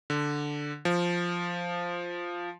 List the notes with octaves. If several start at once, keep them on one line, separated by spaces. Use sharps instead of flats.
D3
F3